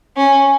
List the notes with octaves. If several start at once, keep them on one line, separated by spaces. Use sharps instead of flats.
C#4